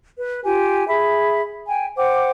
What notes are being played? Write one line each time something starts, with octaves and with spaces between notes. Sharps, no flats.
B4
F4 G4 G#5
G#4 E5 B5
G5 G#5
C5 F#5 G5 D6